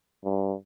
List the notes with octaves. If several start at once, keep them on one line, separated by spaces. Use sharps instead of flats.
G2